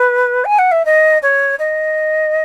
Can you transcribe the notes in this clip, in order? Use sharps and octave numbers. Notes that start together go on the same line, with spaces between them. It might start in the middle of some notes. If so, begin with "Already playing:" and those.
Already playing: B4
G#5
F#5
E5
D#5
C#5
D#5